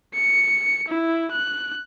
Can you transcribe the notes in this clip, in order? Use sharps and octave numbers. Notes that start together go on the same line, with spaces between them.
C#7
E4
F#6